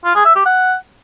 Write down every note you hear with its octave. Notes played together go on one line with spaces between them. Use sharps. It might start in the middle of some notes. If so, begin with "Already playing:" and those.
F4
G#4
E5
G4
F#5